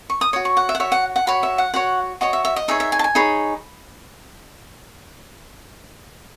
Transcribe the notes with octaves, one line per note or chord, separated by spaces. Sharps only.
C#6
D#6
F#4 C#5 D#6
C#6
F#5
E5
F#5
F#4 C#5 E5
F#5
F#5
F#4 C#5 B5
E5
F#5
F#4 C#5 F#5
F#4 C#5 D#5
E5
E5
D#5
D#4 G#4 C#5 E5
E5
G#5
A5
G#5
D#4 G#4 C#5 B5